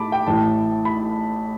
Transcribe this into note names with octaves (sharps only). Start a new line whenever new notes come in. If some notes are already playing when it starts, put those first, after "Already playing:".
Already playing: A2 A5 B5 D6
G5
A1 A2 E3 A5
B5